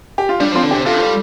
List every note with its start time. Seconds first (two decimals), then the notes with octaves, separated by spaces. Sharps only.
0.18 G4
0.29 F4
0.40 G3 D4
0.52 F3 C4 F4
0.63 D3
0.71 D4 G4
0.75 C3
0.85 C3 F4 A4
1.01 G3